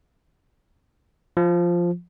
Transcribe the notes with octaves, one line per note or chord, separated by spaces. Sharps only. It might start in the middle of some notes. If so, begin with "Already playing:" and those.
F3